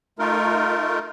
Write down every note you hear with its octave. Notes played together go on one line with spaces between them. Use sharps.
A3 D#4 F4 A#4